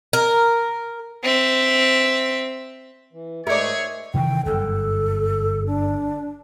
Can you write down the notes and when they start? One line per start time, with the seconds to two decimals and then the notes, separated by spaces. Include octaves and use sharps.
0.13 A#4
1.24 C4 E5
3.13 E3
3.47 G#2 G#3 A3 G#4 A#4 C#5 D5 E5
4.14 C3 D#3 E3 G5
4.46 G1 F#2 A4
5.66 D4